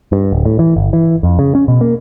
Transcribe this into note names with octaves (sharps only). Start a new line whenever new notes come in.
G2
D1
A2
E3
G1
E3
F2
C#3
C#4
B2
A#3